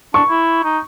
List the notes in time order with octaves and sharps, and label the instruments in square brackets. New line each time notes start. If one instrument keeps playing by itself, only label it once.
[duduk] D4 [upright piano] C#6
[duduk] E4
D#4